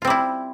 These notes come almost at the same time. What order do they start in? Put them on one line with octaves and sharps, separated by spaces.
F4 C4 G3 E4